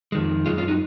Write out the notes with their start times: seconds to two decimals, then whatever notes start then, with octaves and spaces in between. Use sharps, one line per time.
0.12 F2 D#3 G#3
0.46 F#2 F3 G#3 F4 G#4
0.58 C#4 F4
0.68 D#4 F#4